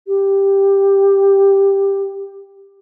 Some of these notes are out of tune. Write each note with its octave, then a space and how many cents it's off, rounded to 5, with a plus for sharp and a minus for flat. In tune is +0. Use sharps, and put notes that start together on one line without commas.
G4 +5